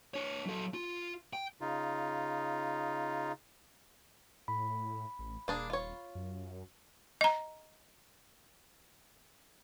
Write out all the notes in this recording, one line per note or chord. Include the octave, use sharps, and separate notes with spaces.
D4 C#5
F#3 A4
F4
G5
C#3 D#4 F4
A2 B5
A1
D#1 A#3 D4 G#4
F4 C#5
F#2
D#5 A#5